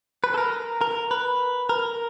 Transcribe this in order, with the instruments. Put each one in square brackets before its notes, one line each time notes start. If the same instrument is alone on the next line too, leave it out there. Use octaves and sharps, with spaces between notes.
[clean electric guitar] B4
A4
A#4
A#4
B4
A#4